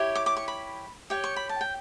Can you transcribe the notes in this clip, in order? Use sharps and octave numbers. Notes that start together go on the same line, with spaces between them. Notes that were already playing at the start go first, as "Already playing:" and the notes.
Already playing: E4 G4 C#5
D6
D6
C#6
B5
G4 C#5 G5
C#6
B5
A5
G5